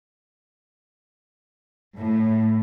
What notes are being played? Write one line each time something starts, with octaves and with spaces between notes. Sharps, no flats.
A2